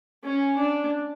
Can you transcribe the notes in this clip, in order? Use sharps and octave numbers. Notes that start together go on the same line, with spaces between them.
C#4
D4